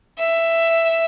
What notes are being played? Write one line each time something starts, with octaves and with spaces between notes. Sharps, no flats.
E5